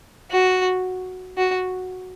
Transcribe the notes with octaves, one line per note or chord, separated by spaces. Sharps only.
F#4
F#4